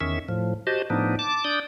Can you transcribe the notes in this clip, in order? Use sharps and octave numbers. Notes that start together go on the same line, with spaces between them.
E2 D#3 C#4 E5
A2 F3
F#4 G4 C5 D#5 A5
A2 F3 B3 D4 D#4
A5 D6
D4 D5 D#6 G6